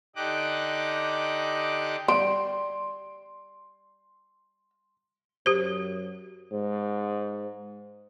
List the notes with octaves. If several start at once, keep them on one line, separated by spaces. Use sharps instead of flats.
D3 D#4 G4 D#5 D6 F#6
G3 C6 D7
F#2 G4 C5
G#2